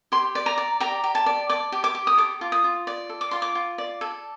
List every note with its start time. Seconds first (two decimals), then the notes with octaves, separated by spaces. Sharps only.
0.12 G4 C6
0.35 D5
0.46 A#5
0.58 D5
0.80 G4 A#5
1.04 G4
1.15 A5
1.26 D5
1.50 D5 D6
1.72 G4
1.84 D6
1.95 G4
2.07 D#6
2.18 A4 D6
2.41 F4
2.52 D#6
2.64 F4
2.87 D5
3.09 A4
3.21 D6
3.31 F4 C6
3.42 D6
3.55 F4
3.78 D5
4.01 A4